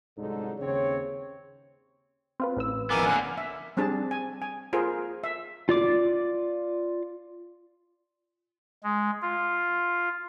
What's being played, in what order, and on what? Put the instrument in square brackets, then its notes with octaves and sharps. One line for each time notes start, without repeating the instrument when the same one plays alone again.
[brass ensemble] C2 G#2 D3 F#3 D#4 A4
D#2 C#3 C4 C#5
[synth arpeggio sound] C4 F4 B4
A1 B4 E6
[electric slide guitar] F2 E3 B3 [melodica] A#4 G#5 D6
[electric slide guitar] D3 A#3 [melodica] C#4 F#5
[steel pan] E5
G3 C4 D4 G#4 A5
G#5
G#5
F4 G#4 A#4 C5
E5
[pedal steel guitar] F4 D5 D6
[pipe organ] G#3
F4